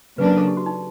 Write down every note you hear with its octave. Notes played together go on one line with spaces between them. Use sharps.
C#3 F#3 A#3 D4 B4
A4
G4
F#4
D#4